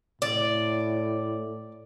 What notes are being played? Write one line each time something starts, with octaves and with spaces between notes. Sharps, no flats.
A2 D5